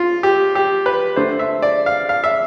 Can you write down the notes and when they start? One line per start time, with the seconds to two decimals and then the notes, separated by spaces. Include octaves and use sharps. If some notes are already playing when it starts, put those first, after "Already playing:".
Already playing: F3 F4
0.23 G4
0.55 G4
0.86 B4
1.16 D3 A3 C5
1.39 E5
1.62 D5
1.86 F5
2.09 F5
2.24 E5